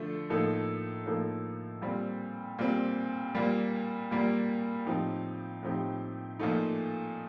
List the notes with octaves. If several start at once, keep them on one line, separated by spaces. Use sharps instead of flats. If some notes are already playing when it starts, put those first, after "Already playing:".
Already playing: D3 F3 A3
A2 F3 A#3 D#4 A4
A2 F3 A#3 D#4 A4
A#2 G3 C4
A#2 G3 C4
A#2 G3 A#3
A#2 G3 A#3
A2 F3 C4 D#4 G4
A2 F3 C4 D#4 G4
A#2 F3 A3 D#4